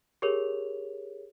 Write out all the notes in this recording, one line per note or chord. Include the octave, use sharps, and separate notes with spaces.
G4 G#4 A#4 C#5 F7